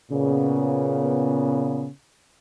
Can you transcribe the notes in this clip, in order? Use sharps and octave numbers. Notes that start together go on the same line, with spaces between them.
A#2 C#3 B3